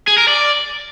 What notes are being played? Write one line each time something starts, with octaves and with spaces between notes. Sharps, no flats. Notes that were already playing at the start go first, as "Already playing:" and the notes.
G#4
A#4
D5